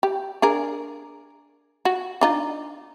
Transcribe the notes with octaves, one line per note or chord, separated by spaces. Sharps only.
G4
D4 G#4 A#4
F#4
D4 D#4 F4